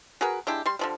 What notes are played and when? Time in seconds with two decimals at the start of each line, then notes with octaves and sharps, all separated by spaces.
0.21 F#4 G#4 A#4 B4
0.47 G#3 D4 E4 G4
0.66 G3 C6
0.79 D3 F3 G3